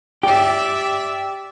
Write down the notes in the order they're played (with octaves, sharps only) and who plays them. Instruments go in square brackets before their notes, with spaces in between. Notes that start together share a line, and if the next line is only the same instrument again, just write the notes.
[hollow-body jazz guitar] G4 [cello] D5 E5